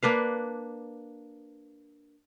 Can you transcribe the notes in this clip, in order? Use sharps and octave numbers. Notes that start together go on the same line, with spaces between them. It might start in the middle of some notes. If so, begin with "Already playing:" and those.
A#3 D4 B4 F5